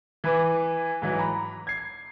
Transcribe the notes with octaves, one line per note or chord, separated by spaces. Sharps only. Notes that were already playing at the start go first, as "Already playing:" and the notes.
E3 B4 D6
G#2 E3 F#3
A#5 B5
G#6 C7